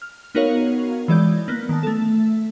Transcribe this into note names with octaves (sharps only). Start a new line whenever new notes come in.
F6
B3 D#4 F#4 A#4 C#5 F5
E3 G#3 D5 G6
A#3 B3 F#6
D#3 A5
A3 A4